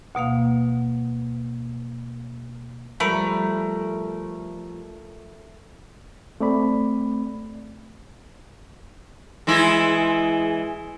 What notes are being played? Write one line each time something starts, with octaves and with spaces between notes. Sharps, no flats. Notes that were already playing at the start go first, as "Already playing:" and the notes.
D2 B2 A#3 F5
F3 G3 A3 A#4 B5
A3 C4 D5 B5
E3 G#3 E4